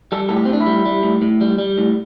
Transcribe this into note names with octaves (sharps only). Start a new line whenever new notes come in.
G3 A4
A2 A4
G4
C4
A2 D4
E4
G3
G3
A2
A2
G3
G3
A2